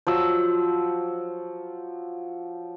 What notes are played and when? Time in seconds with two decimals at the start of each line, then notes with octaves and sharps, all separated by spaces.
0.07 F3 F#3 E6